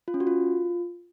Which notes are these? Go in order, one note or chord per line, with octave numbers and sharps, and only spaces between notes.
F4
C#4
F#4
F4